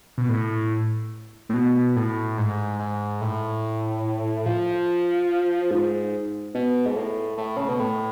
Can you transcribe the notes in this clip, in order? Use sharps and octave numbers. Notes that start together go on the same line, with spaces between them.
B2
A2
A2
B2
A2
G#2
G#2
A2
F3
G#2
B2
G#2
A2
A2
C#3
B2
A2